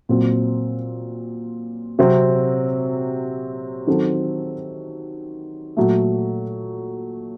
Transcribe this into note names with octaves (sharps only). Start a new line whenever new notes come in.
A#2 F#3 C4
C3 F#3 C4
D#3 F#3 C4 F#4 A4
A#2 F#3 A3